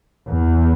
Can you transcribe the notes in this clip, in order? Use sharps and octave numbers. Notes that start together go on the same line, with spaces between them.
E2